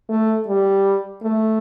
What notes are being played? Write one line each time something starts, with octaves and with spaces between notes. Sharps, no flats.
A3
G3
A3